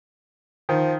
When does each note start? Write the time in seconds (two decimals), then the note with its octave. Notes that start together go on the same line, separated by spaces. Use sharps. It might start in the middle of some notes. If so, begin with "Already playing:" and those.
0.69 D#3 F3